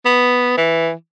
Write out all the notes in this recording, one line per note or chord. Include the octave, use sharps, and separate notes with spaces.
B3
E3